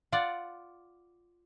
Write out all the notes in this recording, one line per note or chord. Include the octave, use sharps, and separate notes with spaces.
F4 D5 F#5